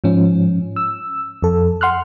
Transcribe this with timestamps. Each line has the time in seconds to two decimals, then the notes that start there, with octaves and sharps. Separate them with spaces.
0.04 G#2 F3 C#4
0.76 E6
1.42 F2 A4
1.81 F#5 C6 F6 F#6